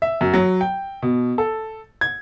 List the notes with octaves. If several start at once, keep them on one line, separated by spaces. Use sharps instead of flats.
E5
F#2
F#3
G5
B2
A4
G#6